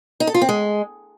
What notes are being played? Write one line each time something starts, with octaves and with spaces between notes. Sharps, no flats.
D#4
A4
F4
C4
G#3